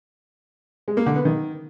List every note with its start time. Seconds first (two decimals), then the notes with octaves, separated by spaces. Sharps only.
0.88 G#3
0.97 A#3
1.06 D3
1.16 B3
1.25 D#3